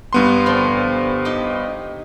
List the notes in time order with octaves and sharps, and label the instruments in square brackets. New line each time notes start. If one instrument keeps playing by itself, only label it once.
[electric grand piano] G2 B3 C6
[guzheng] D3 F3 C4
D#4 G4